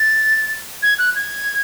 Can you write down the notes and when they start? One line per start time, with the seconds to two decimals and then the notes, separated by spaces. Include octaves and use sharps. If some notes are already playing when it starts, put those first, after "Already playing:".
Already playing: A6
0.83 G#6
0.98 F#6
1.15 G#6